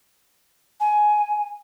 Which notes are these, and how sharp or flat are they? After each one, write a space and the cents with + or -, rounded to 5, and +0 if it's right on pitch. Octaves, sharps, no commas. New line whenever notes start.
G#5 +15